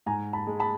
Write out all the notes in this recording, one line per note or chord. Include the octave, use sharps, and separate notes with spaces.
G#2 G#5 A#5
A5 B5
G#3
A5 B5